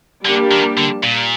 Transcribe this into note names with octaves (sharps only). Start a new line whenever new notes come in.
D3 G3 A#3 D4 G4
D#3
D3
A#2